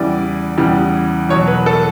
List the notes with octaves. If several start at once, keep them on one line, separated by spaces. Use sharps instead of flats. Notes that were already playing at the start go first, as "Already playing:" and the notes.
Already playing: E2 C#3 E3 G3 D5
E2 C#3 E3 G3
E2 B2 F#3 C#5
B4
A4